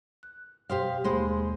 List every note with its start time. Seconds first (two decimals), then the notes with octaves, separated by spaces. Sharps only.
0.23 F#6
0.70 B2 G4 C5 F5
1.04 D#2 G#3 A#3 C5 B5